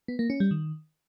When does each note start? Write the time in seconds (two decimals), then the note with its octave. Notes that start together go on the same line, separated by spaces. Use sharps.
0.08 B3
0.19 A#3
0.30 C#4
0.40 G3
0.51 D#3